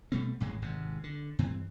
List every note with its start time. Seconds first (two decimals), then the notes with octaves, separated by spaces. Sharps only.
0.12 B2 G3 A3 C4
0.40 A1 A2 E3 G#3
0.62 G#1 G#2 C3
1.04 D3
1.39 G2 E3 C4